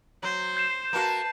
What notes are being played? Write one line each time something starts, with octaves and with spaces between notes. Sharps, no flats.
F#3 C5
G6 C7 E7
A#3 F#4 B4 A5